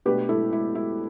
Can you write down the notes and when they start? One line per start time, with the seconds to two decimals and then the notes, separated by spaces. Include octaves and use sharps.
0.05 B2 A3 D4 G4 B4
0.29 E4 A4
0.53 E4
0.75 E4